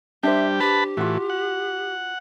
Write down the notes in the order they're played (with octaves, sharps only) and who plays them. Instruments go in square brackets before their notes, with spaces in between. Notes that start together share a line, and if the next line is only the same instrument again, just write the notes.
[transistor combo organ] G3 G4 [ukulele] D4 C5 [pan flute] E5
[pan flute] G4 [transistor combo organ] B4 A5 B5
[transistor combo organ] A2 E3 [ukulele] F4 F#4
[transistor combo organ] F#5